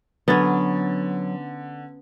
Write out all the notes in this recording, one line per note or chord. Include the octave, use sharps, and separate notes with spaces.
D3 F#3 B3 C#4 A6